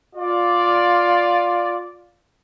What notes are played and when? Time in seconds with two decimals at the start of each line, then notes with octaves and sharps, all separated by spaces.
0.15 F4 D5